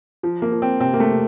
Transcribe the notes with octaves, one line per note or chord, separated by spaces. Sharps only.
F3
A#3
F3
C4
C3 C4
A#3
A3
C3